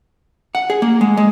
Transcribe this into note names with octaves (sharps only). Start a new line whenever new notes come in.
F#5
G#4
A#3
G#3
G#3